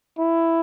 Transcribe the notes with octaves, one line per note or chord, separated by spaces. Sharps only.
E4